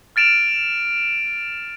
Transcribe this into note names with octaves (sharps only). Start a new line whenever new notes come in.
F6 A6 D7 E7 F7